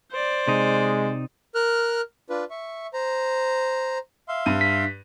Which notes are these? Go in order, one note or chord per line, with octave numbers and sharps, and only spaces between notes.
C5 D5
C3 G#3 D#4
A#4 F6 F#6
D4 F4 B4
E5 C#6
C5 A#5
E5 F5 C6
G2 D#7
B6